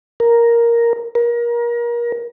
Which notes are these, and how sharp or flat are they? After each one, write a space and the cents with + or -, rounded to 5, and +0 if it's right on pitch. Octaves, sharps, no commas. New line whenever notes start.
A#4 +5
A#4 +30